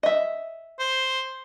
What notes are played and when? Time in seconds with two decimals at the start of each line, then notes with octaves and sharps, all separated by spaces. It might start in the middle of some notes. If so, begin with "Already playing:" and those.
0.03 D#5 E5
0.79 C5